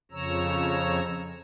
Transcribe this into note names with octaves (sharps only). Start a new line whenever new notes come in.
F2 C#3 F3 C#5 A#5 E6